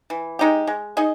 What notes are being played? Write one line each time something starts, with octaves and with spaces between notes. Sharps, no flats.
E3
G#3 D#4 G4
G#3
D#4 G#4 D#5